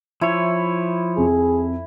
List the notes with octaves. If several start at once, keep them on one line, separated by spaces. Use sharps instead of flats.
F3 E4 C#5
F2 G#4